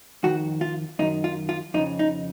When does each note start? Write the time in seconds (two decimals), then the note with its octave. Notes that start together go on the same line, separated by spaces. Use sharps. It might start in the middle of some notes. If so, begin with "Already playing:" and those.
0.23 F2 D#3 F#4
0.61 F4
0.99 F#2 D#3 D#4
1.24 F4
1.49 F4
1.74 F2 D#4
1.78 C#3
1.99 D#4